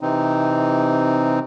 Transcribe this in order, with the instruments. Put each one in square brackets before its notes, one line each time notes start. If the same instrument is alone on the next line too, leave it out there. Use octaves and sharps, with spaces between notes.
[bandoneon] C3 E3 C4 D#4